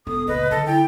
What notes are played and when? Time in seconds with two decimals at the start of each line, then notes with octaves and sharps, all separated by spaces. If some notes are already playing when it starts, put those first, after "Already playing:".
0.07 E1 A4 D#6
0.28 C#2 A#2 A#3 B4 D#5
0.51 D3 F#3 A4
0.66 E4 A4 G5